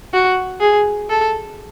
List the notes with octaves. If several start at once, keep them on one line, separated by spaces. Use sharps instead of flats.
F#4
G#4
A4